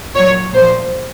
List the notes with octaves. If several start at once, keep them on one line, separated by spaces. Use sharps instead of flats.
A#2 F#3 C#5
A#2 F3 C5